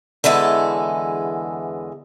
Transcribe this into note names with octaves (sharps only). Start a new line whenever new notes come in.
E2 D3 E3 G#3 A4